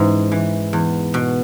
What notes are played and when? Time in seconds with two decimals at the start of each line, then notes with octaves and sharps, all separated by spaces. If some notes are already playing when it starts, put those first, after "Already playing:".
Already playing: G#2 E3 C#4
0.32 E3
0.73 E2
1.14 B2